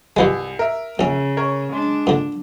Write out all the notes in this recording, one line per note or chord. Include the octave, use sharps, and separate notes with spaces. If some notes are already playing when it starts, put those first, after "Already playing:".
C2 G2 F3 G#3 G#5
A#4 E5
A#1 C#3 C#4
A#4 C#5
G#3 D4
A#2 D3